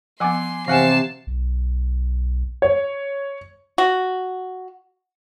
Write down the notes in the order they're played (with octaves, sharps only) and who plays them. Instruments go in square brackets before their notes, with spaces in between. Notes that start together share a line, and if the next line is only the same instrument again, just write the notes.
[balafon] F3 B3 [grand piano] F#5 G#5 D6 [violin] C6
[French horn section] C3 [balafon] E3 [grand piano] F5 F#5 G#5 [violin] A5 C7
[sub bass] B1
[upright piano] C#5
[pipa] F#4